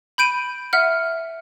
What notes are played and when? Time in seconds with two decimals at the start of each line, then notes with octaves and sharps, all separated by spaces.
0.18 B5 G6 D7 D#7
0.73 E5 F#5 F6